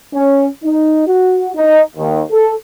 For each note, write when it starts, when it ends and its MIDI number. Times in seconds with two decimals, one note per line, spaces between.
0.13 0.47 61
0.64 1.06 63
1.07 1.50 66
1.55 1.82 63
1.96 2.22 39
2.31 2.53 69